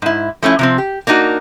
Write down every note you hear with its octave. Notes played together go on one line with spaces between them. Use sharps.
G#2 E4
F3 A3 C#4 E4
C3 F3 C4
G4
A#3 D4 D#4 F4 F#4